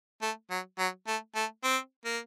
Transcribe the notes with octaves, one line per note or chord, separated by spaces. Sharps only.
A3
F#3
F#3
A3
A3
C4
A#3